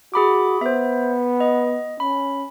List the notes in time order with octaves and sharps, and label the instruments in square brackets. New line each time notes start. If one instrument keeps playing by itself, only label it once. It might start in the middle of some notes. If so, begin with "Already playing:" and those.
[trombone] F#4 [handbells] G#4 B5 D6
[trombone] B3 [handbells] C5 E5
[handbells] D#5
[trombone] C#4 [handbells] B5